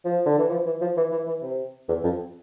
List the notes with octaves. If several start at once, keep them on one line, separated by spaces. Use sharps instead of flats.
F3
D3
E3
F3
E3
F3
E3
E3
E3
C3
E2
F2